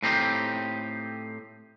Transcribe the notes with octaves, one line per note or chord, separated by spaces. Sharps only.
A2 C4 D#4 G4